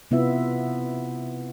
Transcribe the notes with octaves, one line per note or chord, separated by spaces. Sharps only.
C3 B3 E4 F4 E5